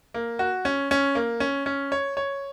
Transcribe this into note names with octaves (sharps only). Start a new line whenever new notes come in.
A#3
F#4
C#4
C#4
A#3
C#4
C#4
C#5
C#5